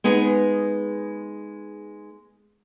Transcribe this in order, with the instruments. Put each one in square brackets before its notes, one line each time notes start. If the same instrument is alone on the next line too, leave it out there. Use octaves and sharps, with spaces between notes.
[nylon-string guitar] G#3 B3 D#4 G#4